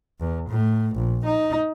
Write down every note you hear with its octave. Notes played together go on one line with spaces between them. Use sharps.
E2
A2
A#1
D#4